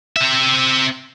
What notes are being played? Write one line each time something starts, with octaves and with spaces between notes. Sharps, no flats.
C4 E5